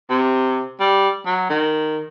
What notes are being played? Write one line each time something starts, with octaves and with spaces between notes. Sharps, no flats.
C3
G3
F#3
D#3